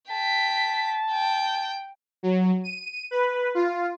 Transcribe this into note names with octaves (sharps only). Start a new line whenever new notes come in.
G5 A5 B6
G5
F#3
D#7
B4
F4